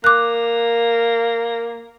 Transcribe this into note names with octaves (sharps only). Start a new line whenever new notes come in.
A#3 D6 F#6